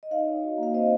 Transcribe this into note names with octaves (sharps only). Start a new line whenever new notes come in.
D#5
D#4 C#5 F5
D#4
F#4
A#3
F5
C4 C5 D#5